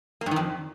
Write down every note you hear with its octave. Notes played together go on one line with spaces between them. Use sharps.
A#3
G2
D#3
F2